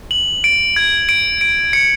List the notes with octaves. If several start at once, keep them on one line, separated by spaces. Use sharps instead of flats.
F#7
D7
G#6
D7
D7
C#7